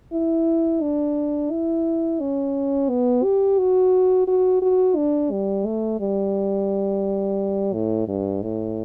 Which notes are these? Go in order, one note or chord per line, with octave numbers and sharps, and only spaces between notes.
E4
D4
E4
C#4
B3
G4
F#4
F#4
F#4
D4
G3
A3
G3
A2
G2
A2